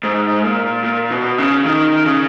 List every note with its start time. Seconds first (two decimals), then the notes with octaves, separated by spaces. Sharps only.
0.03 G#2
0.44 A#2
0.84 A#2
1.11 B2
1.39 C#3
1.65 D#3
2.05 C#3